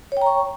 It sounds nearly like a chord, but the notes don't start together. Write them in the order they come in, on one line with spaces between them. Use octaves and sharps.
C#5 G5 A#5 C#6